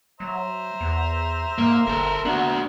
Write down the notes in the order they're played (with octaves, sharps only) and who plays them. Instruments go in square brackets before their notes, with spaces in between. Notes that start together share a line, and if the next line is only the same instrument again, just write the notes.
[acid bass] F#3 [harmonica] C5 E5 A#5
[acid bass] E2
[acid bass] G#2 [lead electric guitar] A#3
[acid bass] G1 [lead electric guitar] A4 A#4
[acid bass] B3 [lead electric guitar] D4 F#4